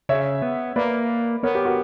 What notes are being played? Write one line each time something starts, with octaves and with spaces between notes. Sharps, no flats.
C#3 C#5 E5
B3
A#3 B4 D5
B3 A#4 C#5
G4 B4
F#4 A#4